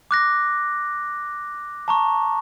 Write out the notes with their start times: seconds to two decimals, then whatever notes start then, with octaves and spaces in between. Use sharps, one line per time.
0.11 D6 F#6 A#6
1.88 A5 A#5 C#6